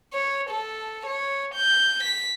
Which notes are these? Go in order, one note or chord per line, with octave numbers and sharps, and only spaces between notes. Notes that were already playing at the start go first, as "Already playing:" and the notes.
C#5
A4
C#5
G6
B6